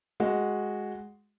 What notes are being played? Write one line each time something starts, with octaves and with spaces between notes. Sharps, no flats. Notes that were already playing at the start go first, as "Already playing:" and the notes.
G#3 F#4